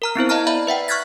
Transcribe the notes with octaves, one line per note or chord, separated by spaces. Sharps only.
A#4 A#5 F6
B3 C4 E4 C5
D#5 F5 A5 A#5 F6
D5 E5 A#5 B5
B4 E5 F#5 G5
C#6 F6 F#6 G#6 A6 B6